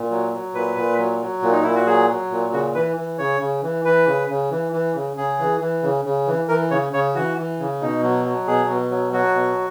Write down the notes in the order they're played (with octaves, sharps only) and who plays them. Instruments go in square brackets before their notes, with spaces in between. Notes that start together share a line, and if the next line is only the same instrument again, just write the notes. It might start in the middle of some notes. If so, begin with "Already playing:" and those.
Already playing: [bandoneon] A#2
F#3
F#3
A#2 B4
A#2
F#3
F#3
A#2
D#4
A#2 E4
F#4
F#3 G#4
F#3
A#2
C#3 F#4
E3 B4
E3
C#3 C#5
C#3
E3
E3 B4
C#3
C#3
E3
E3
C#3
C#3 G#4
E3
E3
C#3
C#3
E3
E3 A#4
C#3 C#5
C#3 C#5
E3 F#4
E3
C#3
B2 D#4
F#3
F#3
B2 G#4
B2
F#3
F#3 F#4
B2